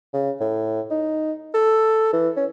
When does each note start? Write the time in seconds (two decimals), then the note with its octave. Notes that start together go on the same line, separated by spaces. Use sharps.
0.13 C#3
0.40 A2
0.91 D#4
1.54 A4
2.13 E3
2.36 C#4